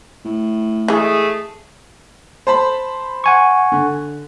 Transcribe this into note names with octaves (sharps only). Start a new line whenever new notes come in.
A2
E3 G#3 A3 G#4
C5 A5 B5
F#5 G#5 C#6
D3